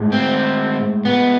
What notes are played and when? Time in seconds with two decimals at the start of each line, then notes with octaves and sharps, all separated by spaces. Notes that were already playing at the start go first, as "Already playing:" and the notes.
Already playing: A2 G#3
0.12 C4
1.05 B3